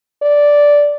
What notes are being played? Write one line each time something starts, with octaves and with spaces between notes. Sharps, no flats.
D5